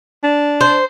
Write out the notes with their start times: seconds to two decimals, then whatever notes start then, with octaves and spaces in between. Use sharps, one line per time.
0.24 D4
0.61 C5